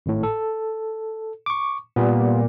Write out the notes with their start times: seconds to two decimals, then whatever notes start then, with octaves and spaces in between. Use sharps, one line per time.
0.06 G#1 A2
0.23 A4
1.46 C#6 D6
1.96 A#2 G3 B3